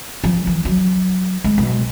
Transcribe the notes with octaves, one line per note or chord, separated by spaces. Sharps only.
F3
E3
F#3
G#3
B1